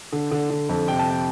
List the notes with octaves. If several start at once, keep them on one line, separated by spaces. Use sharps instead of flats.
D3
D3
D3
F2
C3 G5
A5
G5